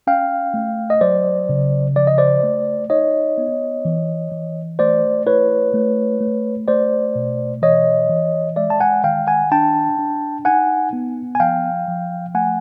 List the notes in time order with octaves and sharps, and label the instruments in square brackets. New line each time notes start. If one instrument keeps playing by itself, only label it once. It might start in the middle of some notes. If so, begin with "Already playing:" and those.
[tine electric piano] C#4 F5 G5
A3
D#5
F#3 C5 D5
C#3
F3 D5
D#5
C5 D5
A3
D#4 C#5 D#5
B3
E3
E3
A3 C5 D5
E4 B4 C#5
A3
A3
A3 C5 D5
B2
E3 C#5 D#5
E3
G#3 D5 E5
A5
F#5 G#5
D#3 F5 G5
F#5 G#5
D4 G5 A5
D4
D#4 F#5 G#5
B3
G#5
F3 F5 G5
F3
A3 F#5 G#5